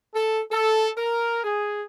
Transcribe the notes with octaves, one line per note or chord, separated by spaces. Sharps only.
A4
A4
A#4
G#4